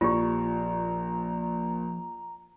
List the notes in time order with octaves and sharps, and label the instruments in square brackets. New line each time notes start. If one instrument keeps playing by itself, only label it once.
[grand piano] A#1 [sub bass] F3 [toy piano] F4 G4 [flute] A#5